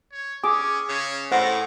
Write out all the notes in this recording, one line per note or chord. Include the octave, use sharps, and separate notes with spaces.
C#5
C#4 G#4 D6
C#3 C#4
A2 C5 F#5 A#5